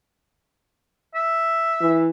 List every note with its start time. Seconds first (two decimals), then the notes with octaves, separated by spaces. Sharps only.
1.15 E5
1.81 E3